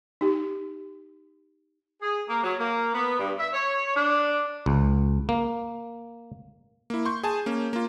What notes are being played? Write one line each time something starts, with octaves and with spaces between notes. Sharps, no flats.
D#4 G4
G#4
A#3
F#3
A#3
B3
G2
E5
C#5
D4
C#2
A#3
A#3 E4
C6 C#6 G6
G#4 G#5 A5
A#3 C#4
A#3 F4